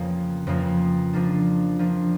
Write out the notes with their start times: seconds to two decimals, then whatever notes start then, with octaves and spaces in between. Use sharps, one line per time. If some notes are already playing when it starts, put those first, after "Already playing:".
Already playing: F2 C#3 F3 A#3
0.47 F2 C#3 F3 A#3
1.13 F3 A#3 D4
1.79 F3 A#3 D4